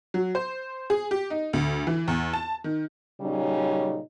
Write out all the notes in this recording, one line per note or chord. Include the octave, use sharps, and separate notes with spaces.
F#3
C5
G#4
G4
D#4
D2
E3
E2
A5
D#3
A#2 C#3 F#3 G3 C#4 D#4